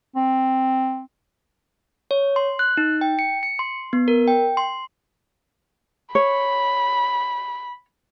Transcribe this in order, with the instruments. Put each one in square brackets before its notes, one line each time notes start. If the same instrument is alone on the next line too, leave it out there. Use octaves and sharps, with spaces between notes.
[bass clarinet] C4
[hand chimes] C#5
C6
F#6
D#4
G5
C#7
C#7
C6
B3
A#4
G5
C6
[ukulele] C#5 [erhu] B5